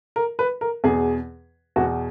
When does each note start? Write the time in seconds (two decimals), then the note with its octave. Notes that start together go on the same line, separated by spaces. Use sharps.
0.16 A#4
0.39 B4
0.61 A#4
0.84 E2 B2 G#4
1.76 E2 B2 F#4